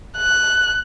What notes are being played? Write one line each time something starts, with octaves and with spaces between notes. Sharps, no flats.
F#6